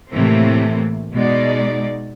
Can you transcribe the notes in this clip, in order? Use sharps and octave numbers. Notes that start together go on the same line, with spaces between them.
A2 C3 E3 A3 A#3 C4
B2 G#3 D#4 D5